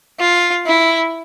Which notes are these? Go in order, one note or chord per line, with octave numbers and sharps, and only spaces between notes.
F4
E4